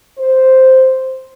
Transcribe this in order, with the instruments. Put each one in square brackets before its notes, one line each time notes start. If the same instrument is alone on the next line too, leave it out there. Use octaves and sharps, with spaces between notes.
[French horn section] C5